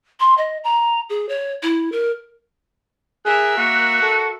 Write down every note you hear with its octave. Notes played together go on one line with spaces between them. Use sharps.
C6
D#5
A#5
G#4
C#5
E4
A#4
G#4 A#4 E5 F#6
A#3 F#4
A4